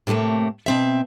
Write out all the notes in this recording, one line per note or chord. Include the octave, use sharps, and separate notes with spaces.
A2 C3 F#3 A3 A#3
B2 C4 E5